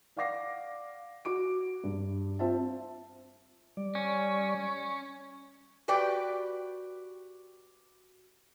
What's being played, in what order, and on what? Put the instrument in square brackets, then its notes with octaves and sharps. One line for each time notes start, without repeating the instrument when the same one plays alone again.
[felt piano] D5 F5 F#5 D6 A#6 C7
F#4 D6 D7
G2
C4 F4 C5 E5 A5
[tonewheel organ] G3 D5
[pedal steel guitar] C#4
[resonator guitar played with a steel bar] F#4 G4 B4 D5 G5